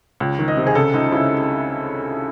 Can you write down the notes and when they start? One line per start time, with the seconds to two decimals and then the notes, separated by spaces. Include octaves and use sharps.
0.20 C#2
0.39 D#3
0.48 D#5
0.57 C3
0.67 G#4
0.75 C#3 A4
0.94 C#2 D#4
1.12 C#3 E4